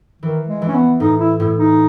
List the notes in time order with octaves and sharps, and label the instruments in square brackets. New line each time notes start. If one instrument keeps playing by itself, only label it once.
[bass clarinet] D#3 [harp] E3
[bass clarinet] G#3
[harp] E3
[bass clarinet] C#4
B3
[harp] A2 [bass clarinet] D#4
[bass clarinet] E4
[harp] A2 [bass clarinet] E4
[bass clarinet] D#4